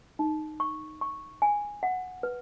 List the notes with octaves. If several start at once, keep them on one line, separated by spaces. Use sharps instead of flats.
D#4
C#6
C#6
G#5
F#5
B4